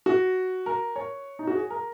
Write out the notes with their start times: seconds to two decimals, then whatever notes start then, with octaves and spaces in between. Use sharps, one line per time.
0.06 F#4
0.66 A#4
0.96 C#5
1.39 D#4
1.47 F#4
1.55 G#4
1.70 A#4